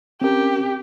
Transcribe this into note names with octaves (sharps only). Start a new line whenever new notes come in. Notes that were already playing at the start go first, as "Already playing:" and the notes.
C4 C#4 G4 A#4